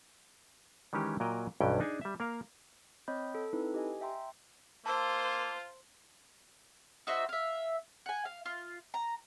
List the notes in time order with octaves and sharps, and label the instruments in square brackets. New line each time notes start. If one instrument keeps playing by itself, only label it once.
[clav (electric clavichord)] D#3 E3 G#3 C#4 D#4 G4
A#2 F#3 A#4 D#5 G5
B1 G2 E3 F#3 C#4 G5
D4 D#4 G#4 G#5
G3 E5
A#3 A#4 F5
[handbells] C4 C#5 D#5 B5 D#6 G6
A4
C4 D#4 E4 A4 B4
G4 D#5 G#5
E5 G5 A#5 C6
[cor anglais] A#3 [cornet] F4 [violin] C5 [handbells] A5 E6
[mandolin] D#4 F#4 C5 E5
E5 F5
F#5 G#5
F5
F4
A#5